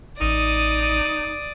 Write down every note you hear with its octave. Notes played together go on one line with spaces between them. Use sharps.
A1 D#4 D5 D#6